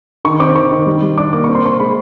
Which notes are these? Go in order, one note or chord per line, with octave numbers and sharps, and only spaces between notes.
D#3 C#6
C4 D6
D#3 C#6
D#3
G3
G3
D4 D6
A#3 D6
C4 C#6
C6
C4 C#6
G#3 B5